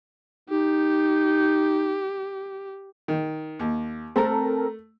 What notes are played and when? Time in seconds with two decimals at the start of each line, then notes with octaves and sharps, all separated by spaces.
0.49 D#4 G4
3.08 D#3
3.60 D#2
4.16 A3 C4 A4 A#4